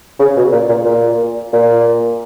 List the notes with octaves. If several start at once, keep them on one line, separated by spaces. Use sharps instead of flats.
C#3
B2
A#2
A#2
A#2
A#2